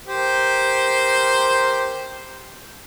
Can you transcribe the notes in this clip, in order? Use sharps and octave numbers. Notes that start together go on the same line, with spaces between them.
G4 A#4 C5